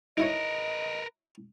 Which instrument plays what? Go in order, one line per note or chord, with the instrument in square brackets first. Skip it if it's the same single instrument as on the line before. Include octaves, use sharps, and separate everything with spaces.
[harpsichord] D#4 E4 C#5 [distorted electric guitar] A#4 B4 [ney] D#5